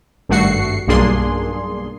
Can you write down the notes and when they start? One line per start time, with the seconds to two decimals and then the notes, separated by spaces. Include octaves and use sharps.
0.29 G#1 G2 A3 F#4 C7 C#7
0.87 B1 G2 A#3 D4 G#4 C6